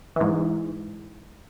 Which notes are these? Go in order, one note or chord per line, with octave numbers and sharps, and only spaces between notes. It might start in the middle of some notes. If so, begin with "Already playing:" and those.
G#2 E3